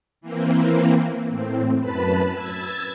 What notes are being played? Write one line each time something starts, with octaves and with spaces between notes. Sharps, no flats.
E3 A#3 C4
A2 C4
F#2 B4 A5 B5
E6 G#6 A6